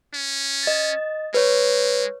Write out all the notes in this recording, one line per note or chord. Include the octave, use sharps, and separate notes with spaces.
C#4
D#5 A6
G#3 B4 C#5